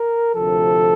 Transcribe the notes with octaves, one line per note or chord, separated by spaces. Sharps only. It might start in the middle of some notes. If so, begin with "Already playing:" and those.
Already playing: A#4
D2 C3 F3 A4